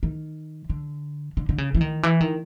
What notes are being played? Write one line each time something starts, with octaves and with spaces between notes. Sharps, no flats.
D#3
D3
D3
D3
C#3
E3
D#3
E3
D#3